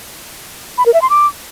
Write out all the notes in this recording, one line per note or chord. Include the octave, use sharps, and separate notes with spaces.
B5
A#4
E5
C6
D6